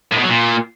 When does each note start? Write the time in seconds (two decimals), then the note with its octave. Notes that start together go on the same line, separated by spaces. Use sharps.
0.11 A2
0.17 B2
0.23 F#3
0.28 A#2